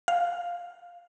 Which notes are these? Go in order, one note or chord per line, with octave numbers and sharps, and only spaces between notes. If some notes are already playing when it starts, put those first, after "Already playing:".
F5